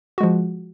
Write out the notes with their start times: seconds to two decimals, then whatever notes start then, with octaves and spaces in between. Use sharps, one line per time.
0.18 F#4
0.21 G#3
0.23 F3